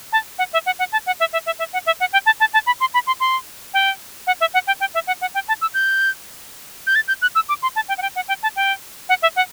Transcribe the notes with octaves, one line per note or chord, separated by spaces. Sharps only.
A5
F#5
E5
F#5
F#5
A5
F#5
E5
E5
E5
E5
F#5
E5
F#5
G5
A5
A5
A5
B5
C6
B5
C6
C6
G5
F#5
E5
F#5
G5
G5
E5
F#5
F#5
G5
A5
E6
G6
G6
A6
G6
F#6
E6
D6
C6
A5
G5
F#5
G5
F#5
G5
A5
G5
F#5
E5
F#5